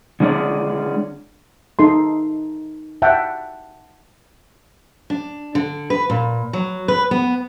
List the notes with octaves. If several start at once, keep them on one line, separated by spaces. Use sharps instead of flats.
D3 G#3 C#4 D5
D#4 A4 C6
E5 F#5 G5 A5
D4
D3
B4
A#2
F#3
B4
B3